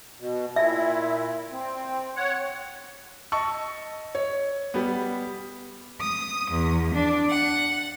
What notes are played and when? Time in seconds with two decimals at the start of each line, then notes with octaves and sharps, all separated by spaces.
0.20 B2
0.56 A#2 E4 E5
1.52 C4
2.16 C#5 F#5
3.32 D#5 A5 C#6 E6
4.15 C#5
4.74 G3 B3
6.00 D#6
6.51 E2
6.94 D4
7.28 F#5